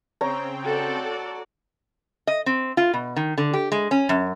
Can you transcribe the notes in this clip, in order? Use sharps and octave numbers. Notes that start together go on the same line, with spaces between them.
C#3 C4 C#5 G5 A#5
F#4 A4 D5
D#5
C4
F4
B2
D#3
D3
G4
G#3
C#4
F#2